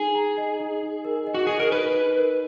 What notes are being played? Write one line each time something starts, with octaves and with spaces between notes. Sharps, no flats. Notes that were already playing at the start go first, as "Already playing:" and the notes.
Already playing: D#4 G#4
A#5
D#5
D#4
D#4
A#4
D#5
F#4
G#4 D#5
A#4
D#4 B4
D#4
A#4